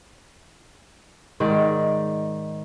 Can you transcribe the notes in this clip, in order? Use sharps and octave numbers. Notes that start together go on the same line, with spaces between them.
G#2 D#3 D5